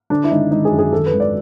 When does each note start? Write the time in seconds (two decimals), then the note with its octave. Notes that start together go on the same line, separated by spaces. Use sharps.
0.10 D3 D4
0.24 E4
0.31 G#1 D#4
0.51 G#1 D#4
0.65 G#4
0.72 F#2
0.79 G#4
0.92 D#3 A4
1.06 B4
1.13 G#1
1.20 D5